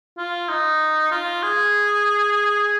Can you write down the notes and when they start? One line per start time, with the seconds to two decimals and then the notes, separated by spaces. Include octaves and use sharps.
0.18 F4
0.49 D#4
1.11 F4
1.43 G#4